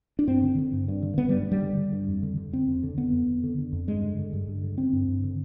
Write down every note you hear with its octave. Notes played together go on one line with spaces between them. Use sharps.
D4
G2 C4
D3
D3
G2
G2
D3
D3 B3
G3
G2
G2 G3
D3
D3
G2
F2
D3
D3
F2 C4
F2
D3
D3 B3
F2
F2
D3
D3
F2
G2 G#3
D3
D3
G2
G2
D3
D3 C4
G2
G2
D3